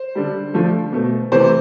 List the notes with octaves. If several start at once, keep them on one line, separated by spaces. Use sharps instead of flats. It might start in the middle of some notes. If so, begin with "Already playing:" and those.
Already playing: C5
D3 G3
D3 F3 A3
B2 A3
C3 E3 A3 C5